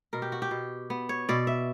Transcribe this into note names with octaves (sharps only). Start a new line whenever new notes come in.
B2 A#4
G4
F#4
G4
B2
B3
C#5
B2 D5
E5